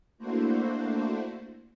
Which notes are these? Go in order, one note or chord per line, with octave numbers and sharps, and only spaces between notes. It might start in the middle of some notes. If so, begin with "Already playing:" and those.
A3 A#3 D4 E4 F#4 C5